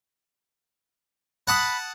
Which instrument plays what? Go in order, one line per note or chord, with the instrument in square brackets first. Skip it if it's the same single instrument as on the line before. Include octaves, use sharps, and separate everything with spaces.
[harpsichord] F#5 A5 D#6 [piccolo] B5